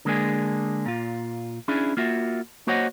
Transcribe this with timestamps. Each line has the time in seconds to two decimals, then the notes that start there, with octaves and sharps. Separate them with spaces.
0.05 D3 G#3 A#3 D4 G#4
0.86 A#2 F4
1.68 C#4 D4 E4 G#4
1.97 A#3 F4 F#4 E5
2.67 A#3 F#4 C5 C#5 D#5 F#5